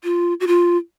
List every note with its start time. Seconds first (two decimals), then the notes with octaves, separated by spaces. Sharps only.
0.04 F4
0.40 F#4
0.47 F4